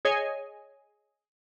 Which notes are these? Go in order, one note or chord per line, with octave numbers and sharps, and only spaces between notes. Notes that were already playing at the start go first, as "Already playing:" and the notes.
G#4 C#5 D#5 G#5